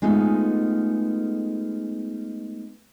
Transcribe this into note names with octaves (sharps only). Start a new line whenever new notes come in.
G#3 A3 B3 D#4 F4